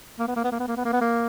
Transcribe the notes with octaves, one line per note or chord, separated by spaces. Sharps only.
A#3
B3
A#3
B3
A#3
B3
A#3
B3
A#3
B3
A#3